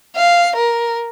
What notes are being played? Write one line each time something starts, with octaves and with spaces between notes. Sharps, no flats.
F5
A#4